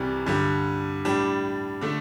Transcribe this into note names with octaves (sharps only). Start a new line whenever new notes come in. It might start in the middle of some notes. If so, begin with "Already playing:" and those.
Already playing: C2 C3 E3 G3 E4
G2 D3 G3
A2 G3 D4
D3 A3 D4